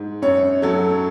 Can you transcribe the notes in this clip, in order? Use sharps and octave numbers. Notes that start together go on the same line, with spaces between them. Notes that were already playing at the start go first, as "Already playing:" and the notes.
Already playing: G#2
F#2 C#5
F#3 A4